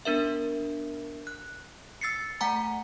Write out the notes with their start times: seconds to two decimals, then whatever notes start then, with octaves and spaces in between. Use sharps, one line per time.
0.05 B3 D4 A#4 E5
1.27 F#6
2.01 E6 A6 C7 C#7
2.41 A3 F#5 G#5 A#5